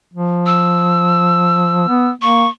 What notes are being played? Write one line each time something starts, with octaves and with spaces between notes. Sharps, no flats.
F3
E6
B3
A#3 C#6